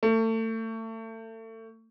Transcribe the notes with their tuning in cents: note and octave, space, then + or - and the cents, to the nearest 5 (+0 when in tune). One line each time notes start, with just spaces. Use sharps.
A3 +30